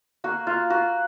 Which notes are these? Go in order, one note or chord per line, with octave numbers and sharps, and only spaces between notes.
A#3 F#4
A#3 F4
A#3 F#4